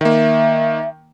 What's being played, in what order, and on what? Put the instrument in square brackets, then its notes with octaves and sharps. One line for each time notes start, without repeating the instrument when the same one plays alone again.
[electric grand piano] D#3 A#3 [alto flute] E5